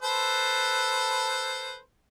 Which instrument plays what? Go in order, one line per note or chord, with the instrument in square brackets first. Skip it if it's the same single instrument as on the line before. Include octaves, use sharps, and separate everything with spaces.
[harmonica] A4 B4 C5